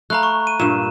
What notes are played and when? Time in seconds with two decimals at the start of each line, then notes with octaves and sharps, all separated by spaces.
0.10 A3 F5 A#5 B5 F#6
0.23 C#6
0.47 D#7
0.60 G2 A#2 E7